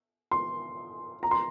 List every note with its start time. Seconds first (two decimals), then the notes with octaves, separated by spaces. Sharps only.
0.31 C6
1.23 A#5
1.31 C6